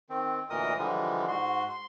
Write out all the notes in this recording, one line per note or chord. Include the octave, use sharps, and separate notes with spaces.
D#3 C4
D2 A#2 E3 A#4 D#5 D#6
D3 E3 F3 G3 G#3
G#2 F#4 C6
C6